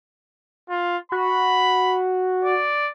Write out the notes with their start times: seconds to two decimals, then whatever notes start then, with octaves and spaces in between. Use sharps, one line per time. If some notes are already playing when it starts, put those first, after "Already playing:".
0.69 F4
1.12 F#4 B5
2.45 D5